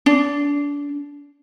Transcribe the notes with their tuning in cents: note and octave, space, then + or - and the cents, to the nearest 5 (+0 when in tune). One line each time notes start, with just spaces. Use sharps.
D4 -30